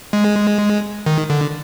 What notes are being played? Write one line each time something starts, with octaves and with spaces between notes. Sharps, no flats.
G#3
D#3
D3